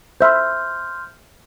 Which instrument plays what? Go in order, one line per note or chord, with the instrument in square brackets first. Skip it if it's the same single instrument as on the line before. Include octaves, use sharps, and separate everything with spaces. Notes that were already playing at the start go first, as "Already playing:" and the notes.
[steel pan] C5 E5 B5 [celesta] C6 F6 G6